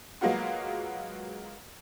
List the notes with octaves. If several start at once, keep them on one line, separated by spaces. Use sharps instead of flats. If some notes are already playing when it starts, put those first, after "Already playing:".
F#3 G#3 A#3 B3 F4 F#4